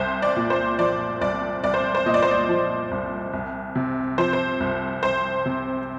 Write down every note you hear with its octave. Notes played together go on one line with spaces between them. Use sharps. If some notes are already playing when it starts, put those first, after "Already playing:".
Already playing: C2 C5
D5
A#2
C5
F3 D5
C2 D5
C2 D5
C5
C5
A#2 D#5
D5
C5
D5
F3
C2
C2
C3
F3 C5
C5
C2
C2 C5
C3